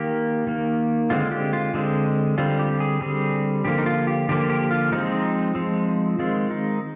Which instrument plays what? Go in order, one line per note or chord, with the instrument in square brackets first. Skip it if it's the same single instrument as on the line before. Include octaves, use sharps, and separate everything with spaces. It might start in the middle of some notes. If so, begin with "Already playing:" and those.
Already playing: [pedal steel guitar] D#3 A#3 G4
D#3 A#3
D3 G#3 C4 F4
G4
F4
D3 G#3 C4
D3 G3 C4 F4
G4
G#4
D3 G3 C4 G#4
D3 F3 A#3 G4
D#4
F4
G4
D3 F3 A#3 G4
G4
F4
F3 G#3 C4 D#4
F3 G#3 C4
D#3 G#3 C4 F4
D#4